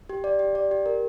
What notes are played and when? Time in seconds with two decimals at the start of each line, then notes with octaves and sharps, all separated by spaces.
0.09 G4
0.24 D5
0.39 G4
0.55 D5
0.71 G4
0.86 A#4